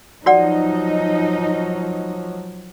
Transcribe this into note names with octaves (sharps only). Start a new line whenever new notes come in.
F3 F#3 D#4 F#4 D5 F#5